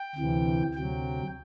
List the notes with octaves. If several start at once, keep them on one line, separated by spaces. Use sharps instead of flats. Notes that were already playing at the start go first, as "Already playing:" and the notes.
Already playing: G5
D2 C3 E3
D2 C3 F#3 G5